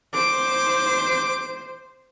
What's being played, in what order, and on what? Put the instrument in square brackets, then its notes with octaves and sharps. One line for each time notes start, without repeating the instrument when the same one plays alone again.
[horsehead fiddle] C5 [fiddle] D6